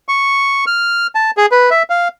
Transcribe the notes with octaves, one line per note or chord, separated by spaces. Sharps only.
C#6
F6
A5
G#4
B4
E5
F5